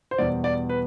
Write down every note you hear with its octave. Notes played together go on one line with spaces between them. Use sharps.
C5
E2 B2 G3 D5
D5
B4